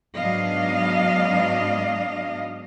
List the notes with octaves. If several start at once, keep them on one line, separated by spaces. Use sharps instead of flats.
G#2 F#3 B3 D4 D#5 F5